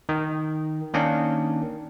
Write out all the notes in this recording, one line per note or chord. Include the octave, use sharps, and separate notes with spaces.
D#3
D#3 A#3 C#4 D4